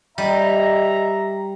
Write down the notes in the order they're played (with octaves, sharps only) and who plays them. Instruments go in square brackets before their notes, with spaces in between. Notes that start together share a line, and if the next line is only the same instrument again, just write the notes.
[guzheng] G3 [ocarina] D#5 [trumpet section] E5 A#5